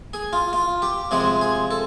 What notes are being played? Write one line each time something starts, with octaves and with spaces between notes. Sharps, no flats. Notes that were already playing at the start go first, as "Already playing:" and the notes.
G#4
F4
F4
G4
C3 F3 G#3 G#4
G#4
A4